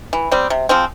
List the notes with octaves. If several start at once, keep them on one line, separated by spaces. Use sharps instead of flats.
E3
G3 C4
C3
F3 G#3 C4